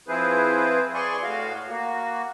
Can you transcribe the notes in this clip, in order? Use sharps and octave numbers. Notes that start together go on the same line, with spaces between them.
F3 C4 E4 G#4 B4 C5
G#4 D5 G#5 C6 C#6
A2 F#4 F5
A#3 F#4